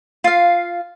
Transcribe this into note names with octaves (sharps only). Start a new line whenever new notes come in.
F4 F5